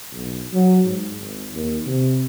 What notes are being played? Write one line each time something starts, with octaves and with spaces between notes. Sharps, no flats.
B1
F#3
G#2
G#1
D#2
C3